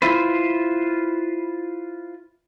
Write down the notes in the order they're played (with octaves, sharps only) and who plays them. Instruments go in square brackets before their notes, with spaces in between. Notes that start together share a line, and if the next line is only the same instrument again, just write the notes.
[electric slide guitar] E4 F4 B4 C5